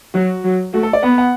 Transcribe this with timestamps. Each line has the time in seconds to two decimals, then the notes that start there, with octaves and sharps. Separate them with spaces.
0.14 F#3 F#4
0.44 F#3
0.73 A3 F#4
0.83 A4
0.93 D5
1.03 B3 F#5
1.18 F#5